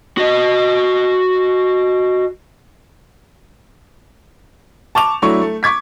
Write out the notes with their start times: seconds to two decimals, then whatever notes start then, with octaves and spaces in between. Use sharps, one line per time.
0.17 F#4 D#5
4.95 A5 C#6 D6 F7
5.22 F#3 A3 D4 E4 C#6
5.42 A3
5.63 C#6 D6 G#6 B6